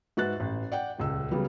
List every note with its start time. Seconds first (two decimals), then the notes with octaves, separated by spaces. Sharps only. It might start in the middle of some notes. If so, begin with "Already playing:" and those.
0.17 G#2 F#4 B4 E5 F#6 A6
0.40 A1
0.72 D5 F#5 G5
0.98 D#1 C#2 E6
1.31 C#3 F#3 G3 B3